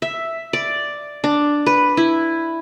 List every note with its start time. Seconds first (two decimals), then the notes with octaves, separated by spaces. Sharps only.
0.02 E5
0.53 D5
1.24 D4
1.66 B4
1.97 E4